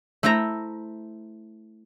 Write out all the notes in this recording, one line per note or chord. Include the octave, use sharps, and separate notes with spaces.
A3 E4 C5 E5 A#5